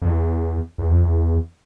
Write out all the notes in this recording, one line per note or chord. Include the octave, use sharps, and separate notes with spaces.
F2
E2
E2
F2
E2